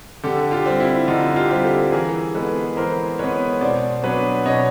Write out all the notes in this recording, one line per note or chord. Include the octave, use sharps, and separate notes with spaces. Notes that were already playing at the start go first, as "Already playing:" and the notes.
D3 G4 A4
F4 G4
G3 C4
E4
D3 D#4 F4
F4 G4
G3 C4
G4 A4
E3 G#4 A#4
G#3 B3 A4 B4
E3 A#4 C5
G#3 B3 B4 C#5
B2 C5 D5
F#3 B3 D4 B4 C#5
B2 C#5 D#5